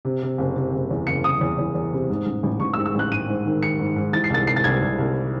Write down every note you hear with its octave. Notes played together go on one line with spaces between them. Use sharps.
C3
C3
F#1
C3
F#1
E2
F#1 C#7
F#1 D#6
E2
E2
E2
C3
G#2
A1
A1
A1 C#6
E6
G#2
E6
A1 F#6
G#2 D#7
G#2
D#3
D#3 C#7
G#2
G#2
E3 A6
C7
C2 A6
C2 C7
A6
C2 G#6
C2
C2